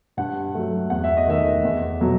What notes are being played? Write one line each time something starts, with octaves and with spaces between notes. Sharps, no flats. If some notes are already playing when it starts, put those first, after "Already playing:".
G2 F#5
F#3 A3
E2 F#5
E5
D#5
D#3 A3 E5
E2
B2 F#3 A3